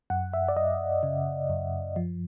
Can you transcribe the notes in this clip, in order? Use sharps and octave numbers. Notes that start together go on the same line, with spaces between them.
F#2 F#5
E5
D5
F#2 D#5
C#3
F#2
F3